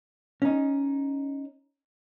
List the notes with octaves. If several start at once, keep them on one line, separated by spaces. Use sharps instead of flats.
C#4 D#4